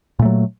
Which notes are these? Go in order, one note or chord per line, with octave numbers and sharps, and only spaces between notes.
A#2 F#3 A3